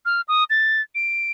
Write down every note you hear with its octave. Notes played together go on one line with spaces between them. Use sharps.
F6
D#6
A6
D7